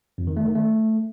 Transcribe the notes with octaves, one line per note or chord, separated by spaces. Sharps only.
F2
D#3
A3
D#3
A3